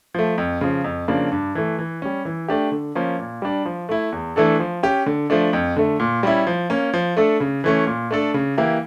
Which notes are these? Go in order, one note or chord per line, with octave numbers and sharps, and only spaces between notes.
F3 A3
F2
C#3 F3
F2
C#3 F3 A#3 D4
G2
E3 A3
E3
G3 C#4
E3
A3 D4 G4
D3
F3 A#3 C#4
A#2
G3 D4
F3
A3 E4
E2
E3 A3 D4 A4
F3
C#4 G4
D3
F3 A3 D4
F2
D3 A3
A#2
G3 C#4 E4
F3
A#3 C#4
F3
A3 D4 A4
C#3
E3 A3 C#4
A#2
A3 D4 A4
C#3
E3 A#3 E4 G4